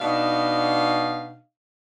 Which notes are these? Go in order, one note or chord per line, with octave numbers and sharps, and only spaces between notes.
B2 D4 D#4 F5